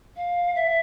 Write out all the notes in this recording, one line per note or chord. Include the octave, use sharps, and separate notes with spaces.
F5
E5